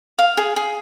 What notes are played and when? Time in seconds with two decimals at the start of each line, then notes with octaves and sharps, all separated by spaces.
0.19 F5
0.37 G#4
0.56 G#4